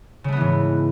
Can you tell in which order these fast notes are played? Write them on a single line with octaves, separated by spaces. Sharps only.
C#3 A3 B3 E3 G#2